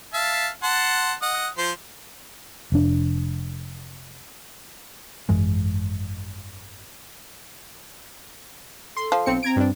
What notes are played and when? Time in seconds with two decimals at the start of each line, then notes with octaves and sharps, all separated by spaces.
0.14 E5 F5 A5
0.63 F#5 A5 C6
1.22 D#5 F#5
1.58 F3 C5
2.72 F1 D4
5.29 G#1 F#2 E3 G#3
8.97 A4 C6
9.12 F3
9.26 B1 C4 C#7
9.43 C4 A#5 G#6 D7
9.56 G2 D4